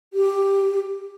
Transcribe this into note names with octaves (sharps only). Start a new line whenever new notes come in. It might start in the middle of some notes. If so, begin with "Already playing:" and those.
G4